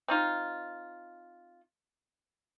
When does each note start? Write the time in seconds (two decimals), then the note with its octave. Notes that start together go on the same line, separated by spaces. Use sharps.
0.08 C4 D#4 F4